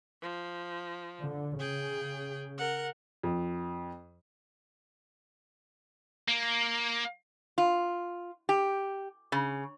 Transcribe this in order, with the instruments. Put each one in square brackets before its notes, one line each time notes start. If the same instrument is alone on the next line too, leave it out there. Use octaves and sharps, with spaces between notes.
[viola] F3
[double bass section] D3
[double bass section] C#3 [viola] G#4 G5
[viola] A#4 F#5
[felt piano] F2
[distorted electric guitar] A#3
[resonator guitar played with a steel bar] F4
G4
C#3